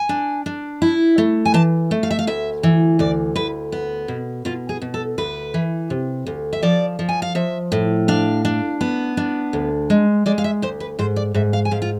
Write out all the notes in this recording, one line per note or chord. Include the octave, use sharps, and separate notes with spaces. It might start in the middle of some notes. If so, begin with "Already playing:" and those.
Already playing: G#5
D4
D4
E4
A3
G#5
E3 A5
A3
F5
E5
F5
D2 E5
E3
D2 D5
D2 B4
B3
B2
B2 F4
G#4
B2
A4
D2 B4
E3
C3
D2
E5
F3 D5
F3
G#5
F5
F3 E5
A2
D4 F5
D4
B3
D4
D2
G#3
G#3 D5
F5
E5
D2 C5
B4
G#2 C5
D5
G#2 E5
F5
G#5
G#2 F5
F4